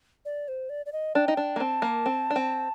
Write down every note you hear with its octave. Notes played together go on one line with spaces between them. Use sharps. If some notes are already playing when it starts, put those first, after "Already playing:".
D5
C5
D5
D5
D#5
D4 G5
D#4
D4
A#3
C4 A5
A#3
C4
D4
C4